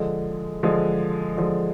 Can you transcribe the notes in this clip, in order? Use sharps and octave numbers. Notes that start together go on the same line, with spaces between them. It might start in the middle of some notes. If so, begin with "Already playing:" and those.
Already playing: D3 F3 G#3
D3 F3 G#3
D3 F3 G#3